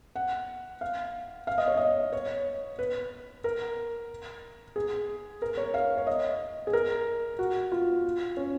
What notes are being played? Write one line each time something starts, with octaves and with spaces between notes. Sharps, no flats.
F#5
F5
F5
D#5
C#5
D#5
C#5
B4
A#4
G#4
A#4
C#5
F5
C#5
D#5
G#4
A#4
F#4
F4
C#4